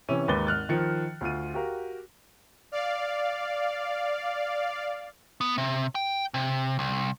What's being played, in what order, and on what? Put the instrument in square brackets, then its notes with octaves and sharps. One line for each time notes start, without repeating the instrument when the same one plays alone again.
[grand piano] C3 E3 C#4 D#7
D#2 G#2 B4 A6 G7
G#1 F6 F#6 A6
D#3 F3 C#7
D2 F4 D#7
F#4 G4 A#4 F5
[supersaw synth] D5 F5
[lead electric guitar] B3
C3
G5
C3
C2